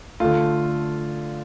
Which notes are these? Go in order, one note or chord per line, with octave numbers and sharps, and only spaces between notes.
D3 A3 F4